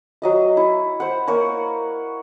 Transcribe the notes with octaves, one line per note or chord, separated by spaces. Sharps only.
F#3 D#5 E5
E4 C#5
C5 F#5
A#3 A#4 C#5